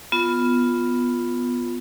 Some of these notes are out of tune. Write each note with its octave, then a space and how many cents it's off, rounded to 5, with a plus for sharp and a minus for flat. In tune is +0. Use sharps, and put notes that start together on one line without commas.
B3 +0 F4 +0